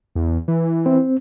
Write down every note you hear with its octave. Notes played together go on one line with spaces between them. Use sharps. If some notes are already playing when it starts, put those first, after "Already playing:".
E2
E3
C4